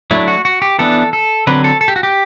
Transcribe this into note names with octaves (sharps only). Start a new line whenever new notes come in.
F#3 A3 D4 E4
F#4
F#4
G4
E3 B3 D4 A4
A4
D3 F#3 C4 B4
A4
A4
G4
F#4
G4